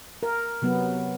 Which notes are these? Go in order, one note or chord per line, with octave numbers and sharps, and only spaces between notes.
A#4
C3 F#3 B3